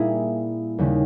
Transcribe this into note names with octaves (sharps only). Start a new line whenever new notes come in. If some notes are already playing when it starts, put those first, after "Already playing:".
Already playing: A#2 G3 A#3 E4 G#4
D#2 C#3 G3